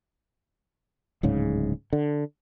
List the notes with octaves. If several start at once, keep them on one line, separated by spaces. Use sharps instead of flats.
D1 G#2 C#3
D3